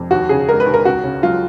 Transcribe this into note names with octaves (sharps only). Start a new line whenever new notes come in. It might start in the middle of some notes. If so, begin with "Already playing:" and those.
Already playing: F2
D#2 F#4
C#3 G#4
G#3 A#4
B4
D#2
A#4
C#2 F#4
C#3
F#3 F4